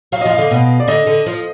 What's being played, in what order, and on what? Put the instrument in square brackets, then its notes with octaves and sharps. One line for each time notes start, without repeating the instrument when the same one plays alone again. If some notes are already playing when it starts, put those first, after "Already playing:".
[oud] F#3 [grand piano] F5
[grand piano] D#5
[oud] F3
[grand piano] F5
[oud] D3
B2
[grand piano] D5
[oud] D3 [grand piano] D#5
[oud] D3
F3